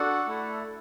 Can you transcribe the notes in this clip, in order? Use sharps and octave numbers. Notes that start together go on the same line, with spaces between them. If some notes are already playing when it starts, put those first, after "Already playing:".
Already playing: D4 F#4 A4 F#5
A3 E4 A4